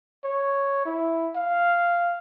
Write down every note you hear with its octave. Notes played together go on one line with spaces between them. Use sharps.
C#5
E4
F5